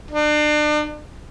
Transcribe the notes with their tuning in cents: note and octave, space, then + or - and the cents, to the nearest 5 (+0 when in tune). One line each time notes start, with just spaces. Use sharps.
D4 +35